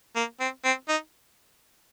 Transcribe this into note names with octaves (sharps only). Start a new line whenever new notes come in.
A#3
C4
C4
D#4